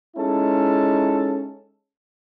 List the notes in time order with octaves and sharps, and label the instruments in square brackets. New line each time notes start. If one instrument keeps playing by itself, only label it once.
[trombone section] G#3 C#4 D#4 E4 A4